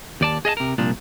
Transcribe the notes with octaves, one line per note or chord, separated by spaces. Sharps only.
D#2 D5 A5
G#4 D#5 F5 A5
C3 A#4
C2 A#2 F3 D4